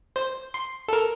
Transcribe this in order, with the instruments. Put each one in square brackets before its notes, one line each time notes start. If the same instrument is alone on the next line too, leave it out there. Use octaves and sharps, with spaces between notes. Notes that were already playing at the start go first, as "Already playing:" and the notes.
[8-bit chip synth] C5
C6
A4 A#4